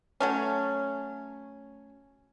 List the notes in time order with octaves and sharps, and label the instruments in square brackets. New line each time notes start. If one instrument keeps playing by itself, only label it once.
[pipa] F#3 A3 C#4